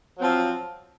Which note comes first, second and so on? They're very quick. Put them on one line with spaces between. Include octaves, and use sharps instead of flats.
F#3 C4 F3